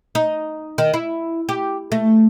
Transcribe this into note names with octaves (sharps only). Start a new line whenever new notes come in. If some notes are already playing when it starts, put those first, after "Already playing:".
D#4
D#3
E4
G4
A3